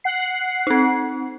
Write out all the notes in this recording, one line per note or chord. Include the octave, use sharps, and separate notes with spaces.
F#5 C7
C4 D#4